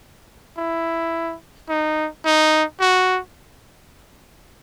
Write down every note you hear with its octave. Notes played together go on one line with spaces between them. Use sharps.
E4
D#4
D#4
F#4